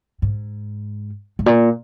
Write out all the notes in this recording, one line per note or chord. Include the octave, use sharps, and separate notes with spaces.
G#2
G#2
A#2